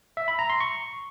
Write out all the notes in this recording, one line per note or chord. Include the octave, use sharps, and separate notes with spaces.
E5
B5
A#5
C6
C#6